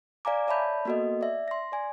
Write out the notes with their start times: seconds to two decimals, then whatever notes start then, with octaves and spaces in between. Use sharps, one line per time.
0.25 D5 F5 G#5 A#5 D6
0.47 C#5 D5 E5 A5 B5 G6
0.85 A#3 B3 F#4 A4 D#5
1.21 D5 E5
1.48 C6 A#6
1.72 D5 G#5